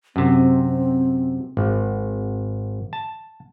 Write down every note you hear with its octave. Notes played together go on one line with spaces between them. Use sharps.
F#2 C3 C4
G#1
A5